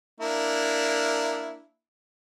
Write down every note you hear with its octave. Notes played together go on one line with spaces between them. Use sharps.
A#3 D4 E4